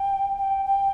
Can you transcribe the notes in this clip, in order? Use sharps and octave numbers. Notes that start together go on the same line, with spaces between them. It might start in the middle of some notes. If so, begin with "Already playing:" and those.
Already playing: G5
G5
G5